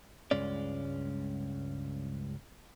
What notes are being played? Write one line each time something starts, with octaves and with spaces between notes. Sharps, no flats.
C#2 G2 G#3 C#4 D5